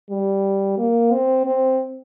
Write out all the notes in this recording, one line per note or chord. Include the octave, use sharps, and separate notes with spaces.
G3
A#3
C4
C4